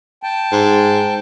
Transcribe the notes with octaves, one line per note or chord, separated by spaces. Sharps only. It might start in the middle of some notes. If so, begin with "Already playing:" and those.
G5 A5
G#2